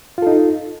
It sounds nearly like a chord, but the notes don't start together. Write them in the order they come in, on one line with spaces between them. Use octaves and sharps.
F4 A4 D#4